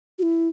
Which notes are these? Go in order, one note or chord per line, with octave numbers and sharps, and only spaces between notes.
F#4
E4